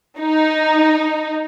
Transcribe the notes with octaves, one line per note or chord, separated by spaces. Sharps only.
D#4